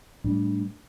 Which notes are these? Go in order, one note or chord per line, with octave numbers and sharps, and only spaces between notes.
A2 G3 D4